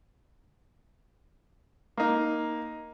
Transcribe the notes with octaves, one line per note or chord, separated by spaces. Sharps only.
A#3 D#4